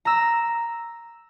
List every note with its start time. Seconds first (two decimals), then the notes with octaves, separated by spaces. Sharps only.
0.05 A#5 E6